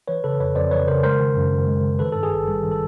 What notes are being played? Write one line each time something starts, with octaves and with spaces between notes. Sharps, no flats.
E3 B4 C#5
C#3 A4 B4
F2 B4 C#5
F2 C5 D5
E3 B4 C#5
C#3 A#4 C5
G#3 A#4 C5
D#3
F#2
F#2
G#3
D#3
D#3 A4 B4
G2 A4
G#4
G#1 A4
G3 A4
D#3
A4